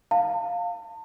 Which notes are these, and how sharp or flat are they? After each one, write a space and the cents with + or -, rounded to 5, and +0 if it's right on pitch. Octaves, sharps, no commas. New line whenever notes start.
F5 +5 A5 +40